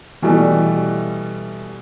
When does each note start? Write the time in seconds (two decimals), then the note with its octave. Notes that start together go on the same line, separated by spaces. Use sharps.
0.22 B2 E3 G3 A3